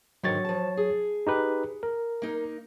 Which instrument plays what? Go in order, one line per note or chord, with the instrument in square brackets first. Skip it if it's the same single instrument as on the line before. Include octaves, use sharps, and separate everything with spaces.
[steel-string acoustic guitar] G#2 D3 D#3 [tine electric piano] F#3 C#5 A6
[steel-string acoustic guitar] F3 A5
G#4
[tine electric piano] D#4 G4 B4
A#4
[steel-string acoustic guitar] A#3 D#4